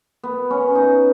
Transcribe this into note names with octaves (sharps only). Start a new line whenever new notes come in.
B3
C#4
D#4